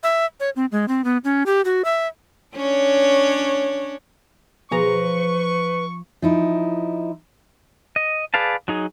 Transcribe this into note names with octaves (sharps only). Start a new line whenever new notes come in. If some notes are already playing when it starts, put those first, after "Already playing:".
E5
C#5
C4
G#3
C4
B3
C#4
G4
F#4
E5
C#4 D4 C#5
B2 F3 G#4 B4 A#5 C#6
F3 D#4 E4
D#5
G#4 B4 D5 F5 A5
F#3 D#4 G#4